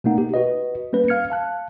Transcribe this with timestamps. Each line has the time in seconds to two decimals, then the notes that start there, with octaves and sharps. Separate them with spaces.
0.04 B2 A3 A#3 D#4 F#5
0.18 G4
0.34 F#4 B4 D#5
0.93 G3 A#3 C#4 B4
1.08 F5 F6 G#6 C#7
1.30 F5 A5 F#6